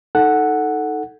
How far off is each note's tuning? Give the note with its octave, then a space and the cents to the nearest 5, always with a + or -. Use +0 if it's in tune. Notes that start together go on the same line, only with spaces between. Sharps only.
D#4 +10 A4 +0 F#5 +0